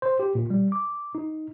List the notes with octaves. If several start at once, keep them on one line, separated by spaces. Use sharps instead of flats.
C5
G4
A#2
G3
D6
D#4